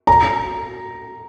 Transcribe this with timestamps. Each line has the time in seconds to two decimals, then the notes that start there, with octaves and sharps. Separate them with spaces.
0.07 A#5